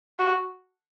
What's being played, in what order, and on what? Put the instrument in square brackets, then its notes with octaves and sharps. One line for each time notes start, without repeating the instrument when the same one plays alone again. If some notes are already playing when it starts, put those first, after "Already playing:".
[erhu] F#4